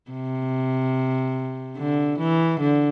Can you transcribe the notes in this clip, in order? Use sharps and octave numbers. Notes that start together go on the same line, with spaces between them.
C3
D3
E3
D3